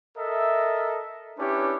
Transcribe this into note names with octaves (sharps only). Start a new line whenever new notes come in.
A4 A#4 D#5 E5
C#4 D4 E4 G4 B4 C#5